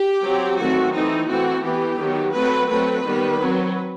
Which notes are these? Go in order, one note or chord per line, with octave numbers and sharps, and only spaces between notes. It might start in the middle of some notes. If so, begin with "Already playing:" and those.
Already playing: G4
F#3 C4
D#3 F#3 A3 C4 F#4
E3 A3 C4 D#4
E3 A3 C4 F#4
E3 B3 G4
D#3 F#3 B3
F#3 A3 C4 B4
F#3 A3 C4 B4
D#3 G3 B3
F#3 C4